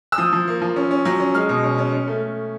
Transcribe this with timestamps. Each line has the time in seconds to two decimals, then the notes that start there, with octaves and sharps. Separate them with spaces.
0.12 E6
0.18 F3 D#6
0.33 F3
0.47 A#3
0.62 F3
0.76 C#4
0.91 C#4
1.05 F#3
1.20 C#4
1.35 G#3 F6
1.49 B2
1.64 C#4
1.78 C#4
1.93 C#4
2.07 A3